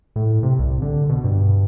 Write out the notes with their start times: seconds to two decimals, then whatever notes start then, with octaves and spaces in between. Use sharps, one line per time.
0.16 A2
0.43 C3
0.59 C2
0.82 D3
1.09 B2
1.24 G2